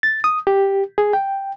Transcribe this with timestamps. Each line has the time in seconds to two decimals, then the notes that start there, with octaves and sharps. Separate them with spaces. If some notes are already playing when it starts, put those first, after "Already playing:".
0.03 A6
0.24 D#6
0.47 G4
0.98 G#4
1.13 G5